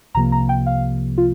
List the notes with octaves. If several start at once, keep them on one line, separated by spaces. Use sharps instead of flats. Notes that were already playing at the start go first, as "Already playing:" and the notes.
C2 C3 F3 A#3 A#5
A#5
G5
F5
F4